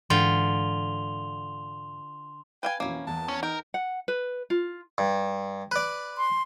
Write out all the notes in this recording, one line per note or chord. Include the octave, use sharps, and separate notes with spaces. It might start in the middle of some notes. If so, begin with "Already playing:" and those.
G#2 D3 E3 F4 G5 C6 F7 G7
B4 F5 G5 G#5
F2 B2 E3 A#3 C#4 E4
E2 A5
C#4
D#4 A#4 G5
F#5
B4
F4
G2
B4 D5
C6